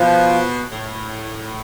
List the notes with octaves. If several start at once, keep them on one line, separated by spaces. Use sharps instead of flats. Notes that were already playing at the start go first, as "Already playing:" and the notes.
Already playing: B2 F3
A2